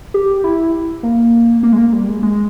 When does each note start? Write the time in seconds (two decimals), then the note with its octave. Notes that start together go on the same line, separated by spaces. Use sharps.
0.14 G4
0.44 E4
1.03 A#3
1.63 A#3
1.73 G#3
1.78 A#3
1.93 G3
2.08 G#3
2.23 G#3